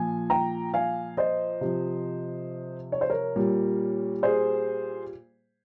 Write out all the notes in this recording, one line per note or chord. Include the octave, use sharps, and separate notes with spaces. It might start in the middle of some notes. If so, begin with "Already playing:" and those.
Already playing: A#2 F3 G#5
G5 A#5
F5 G#5
C5 D#5
C3 F3
C#5
C5
A#4 C#5
A#2 G3
G#4 C5